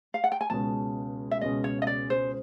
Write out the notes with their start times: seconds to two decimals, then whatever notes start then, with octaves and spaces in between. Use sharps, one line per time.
0.14 F5
0.24 F#5
0.32 G5
0.41 G#5
0.50 C#2 B2 G#3 C#4 A5
1.31 E5
1.41 C#2 B2 G#3 C#4 D#5
1.64 C#5
1.82 D#5
1.87 D5
2.10 C5